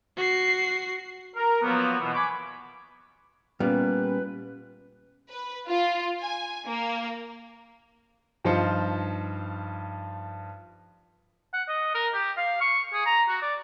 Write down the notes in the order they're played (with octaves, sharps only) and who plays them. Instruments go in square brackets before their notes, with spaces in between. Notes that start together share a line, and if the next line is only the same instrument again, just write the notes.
[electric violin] F#4 C7
[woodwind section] A#4
F3 F#3 A#3 B3
B2 E3 B3
G#5 B5 C#6 D6
[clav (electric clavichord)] A#2 B3 F5 [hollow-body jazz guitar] G3 [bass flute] C#4 [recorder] B4
[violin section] B4
F4
G#5
A#3
[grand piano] G2 F3 D#4 F4 C5 C#7
[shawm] F#5
D#5
A#4
G4
F5
C#6
G#4
A#5
F#4
D5